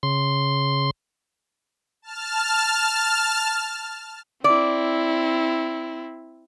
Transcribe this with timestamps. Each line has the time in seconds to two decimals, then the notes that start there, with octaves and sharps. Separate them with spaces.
0.03 C#3 C6
2.02 A5 F6
4.44 C4 E4 D5